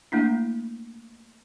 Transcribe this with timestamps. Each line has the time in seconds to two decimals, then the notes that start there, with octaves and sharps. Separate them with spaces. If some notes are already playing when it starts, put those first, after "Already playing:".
0.12 A3 A#3 D4 E4